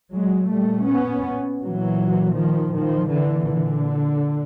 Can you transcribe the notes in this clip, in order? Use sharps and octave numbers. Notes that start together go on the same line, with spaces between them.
A#2 F#3 G#3
G3 A3
B3 C#4
A#2 E3 F#3
D#3 F3
D#3 F3
A#2 D3 E3
D3